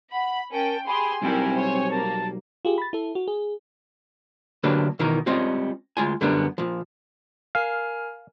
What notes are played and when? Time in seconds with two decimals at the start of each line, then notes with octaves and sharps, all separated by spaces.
0.13 F#5 B5
0.52 C#4 A#4 G5 A5
0.87 G4 G#4 G#5 B5 C6
1.22 B1 G3 C4 E4 A4 A#4 G5
1.54 C5 C#5
1.91 A#3 A5
2.65 F4 G4 G#4
2.78 B5 A6
2.93 E4 A4
3.15 F#4
3.28 G#4
4.63 D3 F#3 A#3 D4 G4 B4
4.99 B2 D#3 E3 A#4
5.26 G3 G#3 C4 C#4 F4 D#5
5.97 D2 G#3 F4 G#5
6.21 F#2 D3 G3 B3 D4 A#4
6.58 A#2 F3
7.55 A#4 F5 G#5 F6